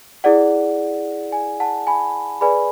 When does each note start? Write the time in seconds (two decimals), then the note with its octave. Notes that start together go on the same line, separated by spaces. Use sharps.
0.24 E4 G#4 D5 F#5
1.32 G#5
1.60 F#5 A5
1.87 G#5 B5
2.41 G#4 B4 D5 G#5 B5